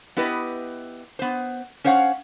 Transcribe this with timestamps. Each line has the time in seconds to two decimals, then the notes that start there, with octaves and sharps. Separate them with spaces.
0.17 B3 E4 G4 B4 D#5
1.19 B3 C5
1.84 C#4 C5 C#5 F5 F#5